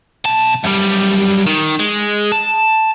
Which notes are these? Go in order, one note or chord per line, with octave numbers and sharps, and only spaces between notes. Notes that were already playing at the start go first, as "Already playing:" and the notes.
B1 A5
F#2 G3
D#3
G#3
A5